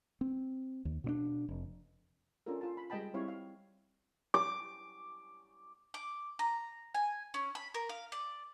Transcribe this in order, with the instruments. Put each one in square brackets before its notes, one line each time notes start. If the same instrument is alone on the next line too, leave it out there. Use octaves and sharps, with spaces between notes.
[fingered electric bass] C4
D#2
B2 C4 D4
F1
[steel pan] C#4 D4 F4 A4 A#4
F4 A5
B5
G3 G#3 D#5 G5 A5 B5
G3 C4 E4 C#5 F5
F5
[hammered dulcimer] D6
[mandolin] D6
A#5
G#5
C#4
B5
A#4
F5
D5